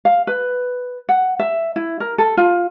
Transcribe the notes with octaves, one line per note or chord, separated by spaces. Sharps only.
F5
B4
F#5
E5
E4
A#4
A4
F4